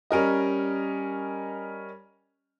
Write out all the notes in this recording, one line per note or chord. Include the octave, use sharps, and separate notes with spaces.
G3 C#4 A#4 D#5